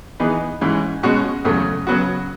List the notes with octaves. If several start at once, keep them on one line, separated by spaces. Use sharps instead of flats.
E3 B3 D#4 G#4
G#2 E3 G#3 C#4
B2 G#3 C#4 F#4
E2 C#3 F#3 A3
C#3 F#3 B3 F#4